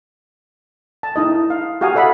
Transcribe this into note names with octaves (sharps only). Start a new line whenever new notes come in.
A5
D#4 E4 D#5
F5
F#4 G4 F5 G#5 A#5 D#6
A4 D5 E5 F#5 B5